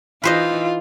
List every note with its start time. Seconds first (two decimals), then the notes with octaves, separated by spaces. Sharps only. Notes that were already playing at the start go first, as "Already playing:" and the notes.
0.24 E3 D#4 F4 B4 C5 D#5